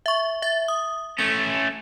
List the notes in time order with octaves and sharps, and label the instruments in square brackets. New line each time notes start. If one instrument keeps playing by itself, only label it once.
[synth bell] E5 C#6
E5 A6
D#6
[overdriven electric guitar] A3 C#4 [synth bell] A6